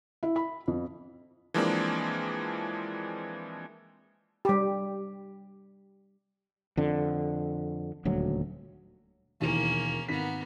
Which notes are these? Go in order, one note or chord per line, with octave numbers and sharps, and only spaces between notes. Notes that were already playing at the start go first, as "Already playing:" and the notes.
E4
B5
F2
E3 F3 G#3 A#3 C4 D4
G3 G4
F2 D3
D#1 D2 F#3
E1 D#2 E3 A#3 C#4
G#1 A#3 B3 B6